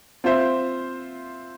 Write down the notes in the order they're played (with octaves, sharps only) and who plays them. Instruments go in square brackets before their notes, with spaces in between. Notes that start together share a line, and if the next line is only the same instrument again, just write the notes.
[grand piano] C4 F4 C5 E5